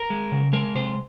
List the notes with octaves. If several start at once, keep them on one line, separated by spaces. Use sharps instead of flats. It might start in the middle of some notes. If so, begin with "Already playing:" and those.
Already playing: A#4
G#3
C#3
G#3 A#4
C3 C5